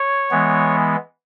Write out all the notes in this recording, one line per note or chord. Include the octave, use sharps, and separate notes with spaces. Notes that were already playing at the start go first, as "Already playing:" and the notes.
Already playing: C#5
E3 G#3 B3